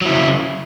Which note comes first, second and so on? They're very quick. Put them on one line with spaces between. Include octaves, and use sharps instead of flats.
F#3 E4 C#3